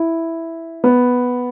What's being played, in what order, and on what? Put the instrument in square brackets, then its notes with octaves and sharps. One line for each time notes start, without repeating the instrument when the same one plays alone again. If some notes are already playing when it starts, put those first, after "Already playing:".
Already playing: [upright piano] E4
B3